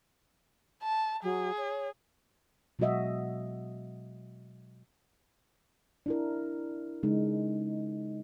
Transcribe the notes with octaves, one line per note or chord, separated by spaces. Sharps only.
A5
F#3 G#4
C#5
B2 F#3 G#3 F#4 D#5 E5
D4 E4 A#4
C#3 G#3 D#4